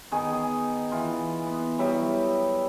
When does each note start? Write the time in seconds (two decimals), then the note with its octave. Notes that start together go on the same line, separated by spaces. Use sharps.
0.12 D#3 B3 G#4
0.91 E3 F4
1.47 B3
1.78 F#3 G3 E4